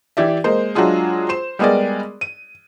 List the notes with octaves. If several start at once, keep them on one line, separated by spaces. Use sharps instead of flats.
E3 G4 D5 E5
G#3 A#3 C5
F#3 G#3 D4 F4 G#4
C5 C6 E7
G3 G#3 B3 G#4 A#4 D5
D#7